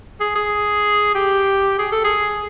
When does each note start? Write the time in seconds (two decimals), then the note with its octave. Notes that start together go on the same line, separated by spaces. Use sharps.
0.20 G#4
0.35 G#4
1.15 G4
1.79 G#4
1.92 A4
2.04 G#4